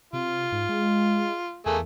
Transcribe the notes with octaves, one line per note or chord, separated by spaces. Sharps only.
C3 F4
G#2
G#3
E2 A3 A#3 G#4